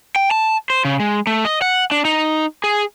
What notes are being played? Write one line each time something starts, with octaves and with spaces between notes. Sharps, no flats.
G5
A5
C5
C#3
G#3
A3
D#5
F#5
D4
D#4
G#4